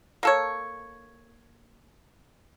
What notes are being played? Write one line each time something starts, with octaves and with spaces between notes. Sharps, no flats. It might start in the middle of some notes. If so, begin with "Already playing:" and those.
A#3 A4 C#5